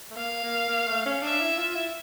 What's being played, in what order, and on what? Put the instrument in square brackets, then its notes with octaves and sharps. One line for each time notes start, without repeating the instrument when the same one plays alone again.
[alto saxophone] A3
[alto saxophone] A#3 [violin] F5
[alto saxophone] A#3
A#3
A3
C#4
[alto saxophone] D4 [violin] E5
[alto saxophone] E4
F4
E4